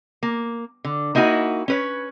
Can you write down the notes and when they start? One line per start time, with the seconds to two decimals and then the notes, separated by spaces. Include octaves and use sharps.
0.23 A#3
0.84 D3
1.15 A#3 D#4 E4 F#4 G#5
1.68 C#4 B4 C#5